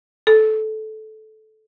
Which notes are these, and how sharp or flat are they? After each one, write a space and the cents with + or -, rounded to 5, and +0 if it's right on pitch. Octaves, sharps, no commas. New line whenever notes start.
A4 -15